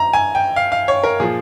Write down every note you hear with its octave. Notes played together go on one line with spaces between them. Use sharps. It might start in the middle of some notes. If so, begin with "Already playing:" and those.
Already playing: A#5
G#5
G5
F5
F5
C#5
A#4
A#2 F3 G#4